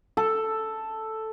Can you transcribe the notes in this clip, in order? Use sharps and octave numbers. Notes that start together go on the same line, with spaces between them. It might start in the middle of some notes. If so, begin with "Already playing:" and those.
A4